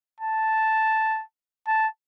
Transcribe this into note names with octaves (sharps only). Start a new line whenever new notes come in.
A5
A5